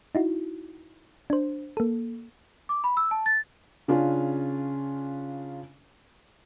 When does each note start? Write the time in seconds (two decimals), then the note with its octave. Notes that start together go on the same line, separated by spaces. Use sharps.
0.15 D#4 E4 F#4
1.30 D4 C5
1.77 A#3 A4
2.69 D6
2.84 B5
2.97 E6
3.11 A5
3.26 A6
3.88 C#3 C#4 D4 F4